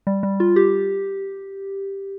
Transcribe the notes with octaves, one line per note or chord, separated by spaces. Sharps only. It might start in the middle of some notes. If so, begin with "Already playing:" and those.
G3
G3
F4
G4